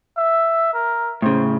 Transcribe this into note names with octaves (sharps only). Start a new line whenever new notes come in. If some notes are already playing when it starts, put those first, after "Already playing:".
E5
A#4
A2 C#3 C5